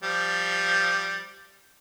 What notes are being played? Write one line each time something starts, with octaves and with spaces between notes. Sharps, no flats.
F3 G3